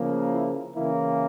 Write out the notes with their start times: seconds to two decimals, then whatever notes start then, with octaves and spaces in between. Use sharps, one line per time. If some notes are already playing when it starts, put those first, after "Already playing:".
Already playing: C#3 F3 A#3
0.28 E4
0.73 C#3 E3 A#3 E4